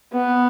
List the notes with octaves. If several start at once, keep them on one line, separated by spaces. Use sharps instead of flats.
B3